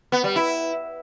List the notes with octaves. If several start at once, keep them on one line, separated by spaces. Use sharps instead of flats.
B3
G3
E4